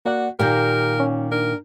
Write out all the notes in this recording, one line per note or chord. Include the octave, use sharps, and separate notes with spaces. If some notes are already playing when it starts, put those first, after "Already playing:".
A#3 F#4 D5 F#5
A#2 D#3 A#3 G4 A#4 G6
C#4
D4 A#4